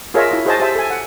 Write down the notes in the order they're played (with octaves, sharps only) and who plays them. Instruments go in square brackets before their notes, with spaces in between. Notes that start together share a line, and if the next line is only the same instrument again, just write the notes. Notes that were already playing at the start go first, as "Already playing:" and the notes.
[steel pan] F4 G#4 A#4 C#5 D#5 E5
E4 F#4
F#4 G#4 C5 D#5 G#5 A5
G4 C5 E5 A5
A4 G#5
F#5